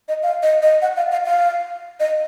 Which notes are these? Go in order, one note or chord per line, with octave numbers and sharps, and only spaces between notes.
D#5
F5
D#5
D#5
F#5
F5
F5
F5
D#5